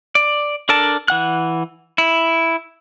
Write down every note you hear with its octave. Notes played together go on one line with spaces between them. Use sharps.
D5
D4 A4 A#4 D5 A5
E3 F#5 F#6
E4